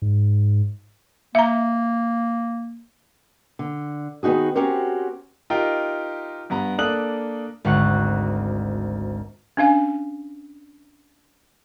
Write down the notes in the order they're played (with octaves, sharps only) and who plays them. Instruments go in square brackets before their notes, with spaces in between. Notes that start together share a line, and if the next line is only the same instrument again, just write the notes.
[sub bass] G#2
[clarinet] A#3 [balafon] E5 A#5
[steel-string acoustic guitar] D3
D#3 B3 D#4 F#4 G#4
C4 C#4 F#4 G4 A#4 C5
[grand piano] D#4 F4 G4 A#4 G5
G2 B3 A#5
A#3 D4 A4 D#6 F#6 F#7
[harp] G#1 D2 F#5 C#6 F#6
[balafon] C#4 D4 F5 G#5